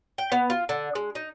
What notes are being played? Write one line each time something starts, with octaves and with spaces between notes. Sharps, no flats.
G5
B3
F4
D3
G#3
D#4